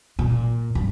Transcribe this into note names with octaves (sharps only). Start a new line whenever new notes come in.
A#2
G2